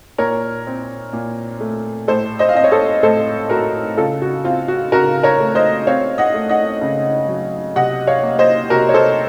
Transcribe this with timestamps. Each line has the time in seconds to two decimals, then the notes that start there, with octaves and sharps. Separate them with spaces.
0.18 A#2 A#4 C#5
0.67 C4
1.13 A#2
1.60 A3
2.08 A2 A4 C5
2.39 C5 D#5
2.49 F5
2.55 C4 D#5
2.64 C#5
2.71 A4 C5
3.03 A2 A4 C5
3.50 A3 F#4 A#4
3.97 C#3 F4 A4
4.22 F#4
4.44 C4 F4
4.68 F#4
4.92 C#3 F#4 A#4
5.23 A#4 C#5
5.40 A3
5.55 C5 D#5
5.87 C4 C#5 F5
6.18 D#5 F#5
6.34 A3
6.49 D#5 F#5
6.81 C#3
7.28 F#3
7.76 C3 D#5 F#5
8.07 C#5 F5
8.23 A#3
8.39 C5 D#5
8.70 C3 F#4 A#4
8.89 C#5
8.94 A4 C5